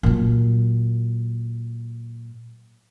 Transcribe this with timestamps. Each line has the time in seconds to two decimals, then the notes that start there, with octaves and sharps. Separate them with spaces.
0.03 A#2 F#3